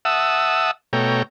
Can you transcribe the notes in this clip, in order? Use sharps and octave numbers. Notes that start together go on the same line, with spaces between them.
E5 F#5 A5 D#6 E6
B2 A3 C#5 G5 A#5